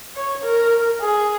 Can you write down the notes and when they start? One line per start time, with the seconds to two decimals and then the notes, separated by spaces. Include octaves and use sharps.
0.16 C#5
0.43 A#4
1.00 G#4